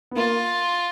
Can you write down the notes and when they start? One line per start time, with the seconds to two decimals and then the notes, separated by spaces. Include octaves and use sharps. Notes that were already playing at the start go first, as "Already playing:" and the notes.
0.11 B3
0.16 A#3 F4